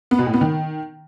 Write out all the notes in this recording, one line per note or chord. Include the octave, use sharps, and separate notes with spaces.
B3
B2
A2
B3
D#3